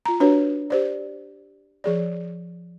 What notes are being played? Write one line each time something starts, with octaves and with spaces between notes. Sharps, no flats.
F4 A#5
D4 F#4 B4 C#5
G4 C5 D5
F3 G#4 D5